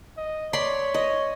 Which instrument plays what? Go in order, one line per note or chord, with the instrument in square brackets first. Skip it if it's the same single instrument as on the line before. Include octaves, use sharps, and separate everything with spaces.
[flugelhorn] D#5
[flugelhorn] C#5 [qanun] D5 B5 C6
[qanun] D#5